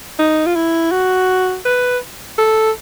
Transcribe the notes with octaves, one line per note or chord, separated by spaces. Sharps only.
D#4
F4
E4
F#4
B4
A4